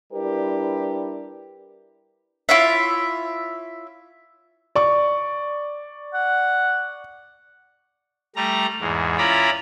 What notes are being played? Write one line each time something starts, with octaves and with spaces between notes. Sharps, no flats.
G3 D4 E4 G4 A#4 B4
E4 F4 C#5 E5
D5 C#6
F#5
G3 A3 A#5
E2 G#2
C#4 E4 F4 D5 A#5 B5